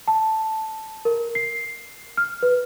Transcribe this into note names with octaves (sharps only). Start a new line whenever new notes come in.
A5
A#4
C7
F6
B4